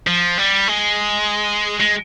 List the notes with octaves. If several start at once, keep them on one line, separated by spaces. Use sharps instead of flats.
F3
G3
G#3
G#3